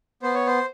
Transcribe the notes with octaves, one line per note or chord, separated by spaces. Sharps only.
B3 C5
C#5
C5